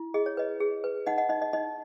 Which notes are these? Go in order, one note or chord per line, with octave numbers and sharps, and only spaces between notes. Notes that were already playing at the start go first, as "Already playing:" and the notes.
Already playing: E4
G#4 D#5
C#5
B4 D#5
G#4
B4
D#4 D#5 F#5
D#5 F#5
D#4 D#5
D#5
D#4 D#5